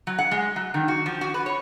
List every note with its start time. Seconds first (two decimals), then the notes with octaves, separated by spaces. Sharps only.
0.07 F#3
0.19 F#5
0.31 G#3
0.56 F#3
0.74 D#3
0.88 F#4
1.06 F3
1.21 F#4
1.34 B4
1.46 C#5